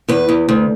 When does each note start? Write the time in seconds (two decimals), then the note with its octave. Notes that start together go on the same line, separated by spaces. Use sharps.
0.08 E2 B4
0.29 E2
0.49 D2